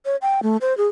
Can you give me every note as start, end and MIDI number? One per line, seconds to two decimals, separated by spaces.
0.05 0.16 73
0.22 0.40 79
0.43 0.57 57
0.61 0.76 72
0.77 0.87 68